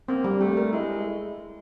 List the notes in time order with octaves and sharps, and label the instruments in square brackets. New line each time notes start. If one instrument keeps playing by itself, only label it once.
[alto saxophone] A#3 [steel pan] C4
[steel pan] G3
[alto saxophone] A3 [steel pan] G4
[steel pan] A#4
[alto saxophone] G#3 [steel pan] E4